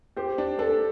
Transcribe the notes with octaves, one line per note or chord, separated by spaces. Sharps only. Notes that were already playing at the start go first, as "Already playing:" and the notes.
G4 C5
D4
D4 A4